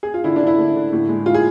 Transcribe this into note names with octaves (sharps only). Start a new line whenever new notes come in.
G#4
F4
D3 E4
D4
D3 E4
A3
D3
A2
G#3
A2 F4
G#4